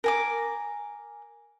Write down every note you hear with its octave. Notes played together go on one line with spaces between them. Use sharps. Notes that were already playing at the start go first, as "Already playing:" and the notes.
A#4 G#5 D6